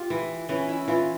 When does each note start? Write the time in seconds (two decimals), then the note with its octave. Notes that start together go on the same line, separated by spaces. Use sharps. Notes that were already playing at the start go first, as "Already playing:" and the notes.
Already playing: F4 G4
0.10 E3
0.49 E3 C#4
0.69 E4
0.88 E3 F4